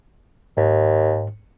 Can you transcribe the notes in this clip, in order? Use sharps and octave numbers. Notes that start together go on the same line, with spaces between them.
D#2 G#2